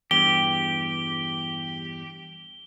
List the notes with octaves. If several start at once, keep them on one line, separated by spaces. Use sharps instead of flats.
E2 G2 G4 G7